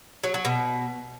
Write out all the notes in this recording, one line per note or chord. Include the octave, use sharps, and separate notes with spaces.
F#3
F#3
B2